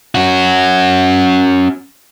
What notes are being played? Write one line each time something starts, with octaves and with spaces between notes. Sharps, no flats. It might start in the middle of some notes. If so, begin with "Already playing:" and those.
C#4 F#4